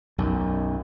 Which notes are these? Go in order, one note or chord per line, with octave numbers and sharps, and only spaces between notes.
B1 F#2